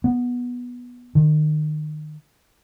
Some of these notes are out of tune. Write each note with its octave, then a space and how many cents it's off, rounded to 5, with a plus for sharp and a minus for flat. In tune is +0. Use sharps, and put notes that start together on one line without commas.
B3 -10
D#3 -30